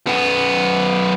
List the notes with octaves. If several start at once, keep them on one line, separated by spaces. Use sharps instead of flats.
F#2 B3